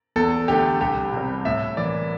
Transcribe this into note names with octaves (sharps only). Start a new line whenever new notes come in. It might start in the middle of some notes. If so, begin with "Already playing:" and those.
E2 A4
D3 A3 G4
C2 G4
C3 G3
A2 E5
E3 A#3 D5